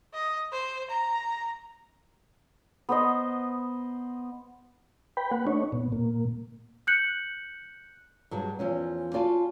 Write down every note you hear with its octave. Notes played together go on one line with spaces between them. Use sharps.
D#5
C5
A#5
B3 C5 D#5
B4 G5 B5
A#3 B4 F#5
A3 D4 D#4 C#5
A#2 B3
A#2 A#3
F#6 G6 C#7 F#7
G2 F#3 G#3
E2 F3 C#4
F4 F#4 D5 G#5 A5